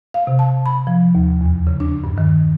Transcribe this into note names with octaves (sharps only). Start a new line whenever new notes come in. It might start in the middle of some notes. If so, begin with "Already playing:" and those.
F5
C3
A5
B5
F3
D#2
E2
C#3
D4
G2
D#3